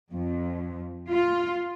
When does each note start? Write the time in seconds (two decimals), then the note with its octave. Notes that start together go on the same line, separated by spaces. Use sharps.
0.14 F2
1.12 F4